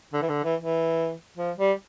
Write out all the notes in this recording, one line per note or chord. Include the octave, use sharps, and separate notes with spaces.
D3
E3
D3
E3
E3
F3
G3